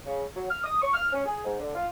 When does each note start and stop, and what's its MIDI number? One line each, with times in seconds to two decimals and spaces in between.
0.06 0.24 49
0.35 0.49 54
0.50 0.61 89
0.64 0.79 87
0.81 0.92 85
0.94 1.10 89
1.13 1.24 61
1.26 1.45 68
1.45 1.57 44
1.60 1.74 50
1.74 1.86 65